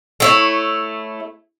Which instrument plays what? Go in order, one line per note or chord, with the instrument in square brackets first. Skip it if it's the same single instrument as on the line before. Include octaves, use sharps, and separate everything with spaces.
[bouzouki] A3 E4 C#5